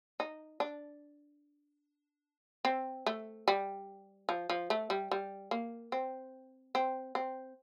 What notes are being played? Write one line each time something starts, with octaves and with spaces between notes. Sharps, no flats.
D#4
D4
C4
A3
G3
F3
F3
A3
G3
G3
A#3
C4
C4
C4